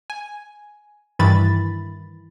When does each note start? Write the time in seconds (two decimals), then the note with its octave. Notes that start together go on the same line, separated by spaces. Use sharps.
0.10 G#5
1.19 G2 D#3 E3 E4 B5 A6